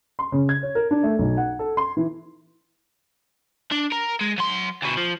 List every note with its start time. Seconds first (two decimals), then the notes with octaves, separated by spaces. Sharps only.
0.19 C6
0.32 C#3
0.49 G#6
0.63 C#5
0.75 A#4
0.91 D4
1.03 A3
1.19 B1
1.37 F#5
1.59 A4
1.77 C6
1.97 E3
3.72 D4
3.92 A#4
4.21 G#3
4.38 F#3 C6
4.82 D2 B2
4.97 F3